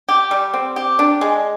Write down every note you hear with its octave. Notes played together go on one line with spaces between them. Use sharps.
G4
G3
C4
G4
D4
G#3